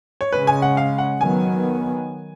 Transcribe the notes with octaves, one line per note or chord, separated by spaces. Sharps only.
C#5
C#3 G#3 C#4 B4
G#5
F#5
F5
F#5
D#3 F#3 B3 G#5